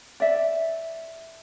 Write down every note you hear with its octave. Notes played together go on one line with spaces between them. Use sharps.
D5 E5